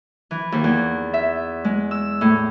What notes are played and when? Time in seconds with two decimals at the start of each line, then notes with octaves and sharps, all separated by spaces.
0.31 E3
0.52 D#2
0.64 E2
1.14 E5
1.65 G#3
1.91 E6
2.21 A2